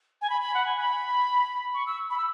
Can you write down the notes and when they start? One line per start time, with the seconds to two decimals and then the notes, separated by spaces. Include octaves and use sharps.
0.22 G#5
0.30 B5
0.41 B5
0.54 F#5
0.66 G#5
0.77 B5
1.74 C#6
1.86 E6
2.10 B5
2.18 E6